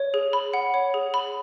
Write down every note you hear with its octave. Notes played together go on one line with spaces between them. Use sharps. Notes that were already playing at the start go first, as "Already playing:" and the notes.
Already playing: C#5
G#4
B5
F#5
C#5
G#4
B5